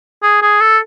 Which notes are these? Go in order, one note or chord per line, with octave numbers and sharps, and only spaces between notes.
G#4
G#4
A4